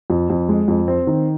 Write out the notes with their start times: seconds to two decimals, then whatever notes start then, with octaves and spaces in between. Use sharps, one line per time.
0.10 F2
0.30 F2
0.49 G#3
0.68 F2
0.88 C4
1.07 D#3